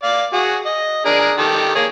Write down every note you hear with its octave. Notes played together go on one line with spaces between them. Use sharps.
D5 F5
F#4 G#4
D#5
D4 G#4 A#4
D#3 G4 A4
A#3 G#4 C#5